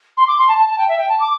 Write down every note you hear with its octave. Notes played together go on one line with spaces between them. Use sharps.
C6
D6
C6
A5
A5
A5
G5
E5
G5
A5
D6